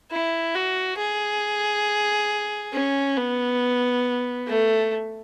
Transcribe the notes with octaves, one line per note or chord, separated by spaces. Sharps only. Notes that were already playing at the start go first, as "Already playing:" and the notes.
E4
F#4
G#4
C#4
B3
A3